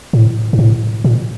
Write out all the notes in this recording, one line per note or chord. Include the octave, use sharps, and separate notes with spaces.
A2
G#2
A2
A#2